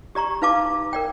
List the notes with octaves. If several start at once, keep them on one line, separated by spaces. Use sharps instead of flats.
G4 D5 A#5 C#6
D#4 B4 F5 A5 D6
A#4 D5 G5